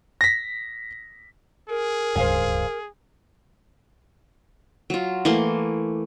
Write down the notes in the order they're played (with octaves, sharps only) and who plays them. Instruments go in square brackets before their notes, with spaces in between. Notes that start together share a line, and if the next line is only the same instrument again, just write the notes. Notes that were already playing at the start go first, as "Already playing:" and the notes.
[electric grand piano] A#6 B6
[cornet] G#4 [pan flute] A#4
[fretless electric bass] D1 C#2 G2 [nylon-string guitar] C5 F5 G#5
[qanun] F#3 F4
E3 A3 A#3 C6